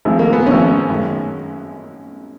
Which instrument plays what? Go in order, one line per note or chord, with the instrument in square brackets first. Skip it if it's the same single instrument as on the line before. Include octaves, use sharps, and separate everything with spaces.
[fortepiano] G#1 G#2 F3 G#3
A#3
B3
G#1 G#2 F3 G#3 C#4
F#2 D#3 G#3